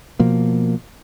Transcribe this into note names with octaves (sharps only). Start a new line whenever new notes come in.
B2 F3 A#3